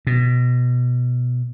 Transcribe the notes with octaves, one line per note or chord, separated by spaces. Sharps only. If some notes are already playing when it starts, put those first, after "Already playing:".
B2